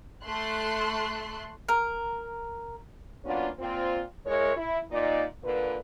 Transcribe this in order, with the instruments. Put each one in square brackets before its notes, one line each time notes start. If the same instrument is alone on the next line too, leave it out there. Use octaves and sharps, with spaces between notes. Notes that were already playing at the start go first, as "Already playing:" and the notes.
[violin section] A3 C6 F#6
[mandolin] A#4
[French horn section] F#3 A#3 B3 C#4 D4 F4
A#2 C4 F4
G#3 E4 A#4 C#5
E4
A#2 D#4 D5
A#2 D3 A#3 B4